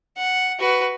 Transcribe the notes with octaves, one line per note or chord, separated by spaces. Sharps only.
F#5
F#4 B4